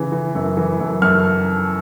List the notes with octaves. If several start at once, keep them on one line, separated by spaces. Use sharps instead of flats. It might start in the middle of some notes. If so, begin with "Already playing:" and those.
Already playing: C#3 E3
E3
F#2
E3
F#2
F#2 F6